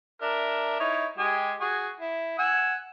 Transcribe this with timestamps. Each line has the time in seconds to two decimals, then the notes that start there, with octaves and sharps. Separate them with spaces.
0.22 D4 A#4 E5
0.80 D#4 E4 C#5
1.18 G#3 G4 G#4
1.61 F#4 G#4 C#6
2.00 E4
2.39 F#5 G#5 E6